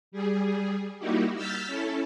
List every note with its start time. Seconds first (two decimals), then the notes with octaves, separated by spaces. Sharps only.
0.12 G3 G#4
0.99 G3 A#3 D#4 E4 F#4 G4
1.35 E6 F6 G6 A6 B6
1.67 C#4 E4 A4